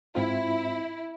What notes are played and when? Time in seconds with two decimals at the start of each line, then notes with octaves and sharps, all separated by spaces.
0.15 G#2 C4 E4 F4